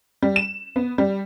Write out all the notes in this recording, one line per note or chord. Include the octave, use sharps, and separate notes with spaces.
G3
E7
B3
G3